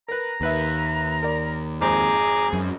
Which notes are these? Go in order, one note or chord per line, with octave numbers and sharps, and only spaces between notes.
A#4 B4 A#5
D#2 A#4 B4 E5
A#4 D5
G#1 F2 G#4 C5 A#5 D6
F#2